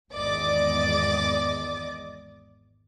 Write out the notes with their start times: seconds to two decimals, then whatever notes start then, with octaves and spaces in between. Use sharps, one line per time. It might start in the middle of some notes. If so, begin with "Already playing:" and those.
0.12 G#1 E2 D5 D#5 D6 A6